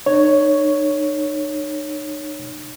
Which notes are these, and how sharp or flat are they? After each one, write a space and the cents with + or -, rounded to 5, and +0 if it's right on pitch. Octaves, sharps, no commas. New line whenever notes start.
D#4 -40 C#5 +5